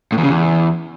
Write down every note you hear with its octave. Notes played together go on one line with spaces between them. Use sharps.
A2
E2
C#3
E2